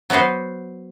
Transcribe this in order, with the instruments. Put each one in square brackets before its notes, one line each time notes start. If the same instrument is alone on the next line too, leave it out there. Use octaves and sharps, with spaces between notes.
[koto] F#3 B3 F#4 B4 C5